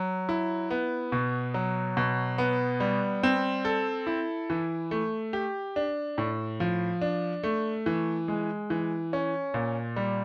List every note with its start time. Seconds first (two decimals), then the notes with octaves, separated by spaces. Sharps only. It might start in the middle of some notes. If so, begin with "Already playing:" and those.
Already playing: F#3
0.29 E4
0.70 B3
1.12 B2
1.54 F#3
1.97 B2
2.38 B3
2.80 G3
3.23 C4
3.65 A4
4.07 E4
4.50 E3
4.91 A3
5.33 G4
5.76 D4
6.18 A2
6.60 F3
7.02 D4
7.43 A3
7.86 E3
8.28 G#3
8.70 E3
9.13 C#4
9.54 A#2
9.96 G3